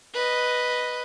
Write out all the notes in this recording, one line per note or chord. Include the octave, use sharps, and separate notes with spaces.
B4 D#5